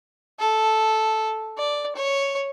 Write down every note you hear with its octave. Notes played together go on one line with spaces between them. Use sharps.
A4
D5
C#5